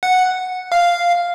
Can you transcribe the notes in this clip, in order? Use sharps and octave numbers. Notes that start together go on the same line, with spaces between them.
F#5
F5